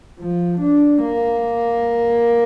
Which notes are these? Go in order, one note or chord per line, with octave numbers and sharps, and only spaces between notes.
F3
D4
A#3